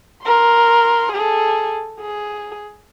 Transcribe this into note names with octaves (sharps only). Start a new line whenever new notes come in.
A#4 C6
G#4 A4
G#4